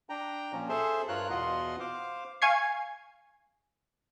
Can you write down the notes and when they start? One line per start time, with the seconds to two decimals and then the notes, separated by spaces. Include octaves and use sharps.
0.09 D4 G5 A#5
0.53 A#2 F3 C#4
0.69 G#4 A4 C5 E5 C6
1.09 G2 F4 A#4 C#5 F#6
1.30 E2 B2 F4 D#5 F#5 C6
1.80 C5 F5 D6
2.42 F5 G#5 C#6 G#6 C7